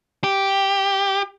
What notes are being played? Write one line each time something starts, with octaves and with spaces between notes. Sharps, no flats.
G4